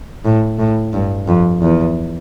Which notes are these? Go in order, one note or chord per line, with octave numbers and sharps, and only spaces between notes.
A2
A2
G2
F2
E2